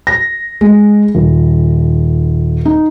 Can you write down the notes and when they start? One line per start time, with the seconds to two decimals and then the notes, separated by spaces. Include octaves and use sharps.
0.07 A#6
0.61 G#3
1.15 D#1
2.65 D#4